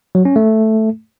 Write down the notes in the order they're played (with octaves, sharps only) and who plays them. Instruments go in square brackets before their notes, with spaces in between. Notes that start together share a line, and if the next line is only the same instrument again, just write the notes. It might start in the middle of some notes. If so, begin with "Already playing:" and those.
[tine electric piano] F#3
C#4
A3